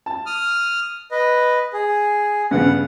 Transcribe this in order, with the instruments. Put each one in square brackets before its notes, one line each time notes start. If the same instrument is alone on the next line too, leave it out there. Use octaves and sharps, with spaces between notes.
[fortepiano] A5
[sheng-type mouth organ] D#6 F6
B4 D#5
G#4
[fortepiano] G2 C#3 B3 [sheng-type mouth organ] F#5